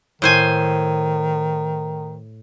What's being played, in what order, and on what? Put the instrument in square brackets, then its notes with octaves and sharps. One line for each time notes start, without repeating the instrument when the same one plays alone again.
[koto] A2 C5 G#5 [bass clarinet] D#3